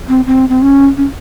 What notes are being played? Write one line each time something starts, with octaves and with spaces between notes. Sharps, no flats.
C4
C4
C4
C#4
C#4